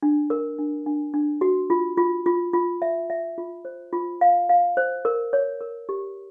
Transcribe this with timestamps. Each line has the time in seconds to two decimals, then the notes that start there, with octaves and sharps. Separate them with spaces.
0.03 D4
0.30 A#4
0.59 D4
0.86 D4
1.14 D4
1.41 F#4
1.70 F4
1.97 F4
2.26 F4
2.53 F4
2.82 E5
3.10 E5
3.38 F4
3.65 C5
3.93 F4
4.21 F5
4.49 F5
4.77 C5
5.05 A#4
5.33 C#5
5.61 A#4
5.89 G4